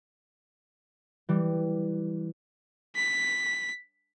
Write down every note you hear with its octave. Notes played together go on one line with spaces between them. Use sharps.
E3 G3
B6